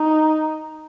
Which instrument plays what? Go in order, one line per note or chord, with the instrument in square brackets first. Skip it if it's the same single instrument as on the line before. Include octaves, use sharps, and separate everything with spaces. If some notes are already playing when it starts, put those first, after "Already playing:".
Already playing: [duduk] D#4